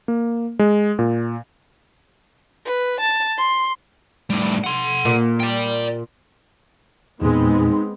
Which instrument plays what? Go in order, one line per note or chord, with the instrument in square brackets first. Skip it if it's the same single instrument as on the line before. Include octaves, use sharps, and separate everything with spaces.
[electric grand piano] A#3
G#3
A#2
[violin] B4
A5
C6
[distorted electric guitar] A2 G3
F#5 C6
[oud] A#2
[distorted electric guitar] D5 G5
[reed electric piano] E2 A#2 [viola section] G#3 B3 C4 [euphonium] D#4